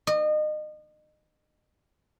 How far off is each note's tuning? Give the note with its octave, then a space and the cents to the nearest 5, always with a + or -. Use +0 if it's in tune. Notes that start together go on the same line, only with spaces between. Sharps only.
D#5 -30